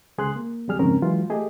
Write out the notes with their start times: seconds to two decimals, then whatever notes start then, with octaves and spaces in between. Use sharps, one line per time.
0.18 C#2 G#4 C6 F#6
0.36 A#3
0.68 C2 F2 D3 G3 G#4 F6
0.79 F2 G#2 C#3 C4 C#4 A#4
1.02 E3 F#3 G#3 F4
1.30 A3 G4 G#4 D#5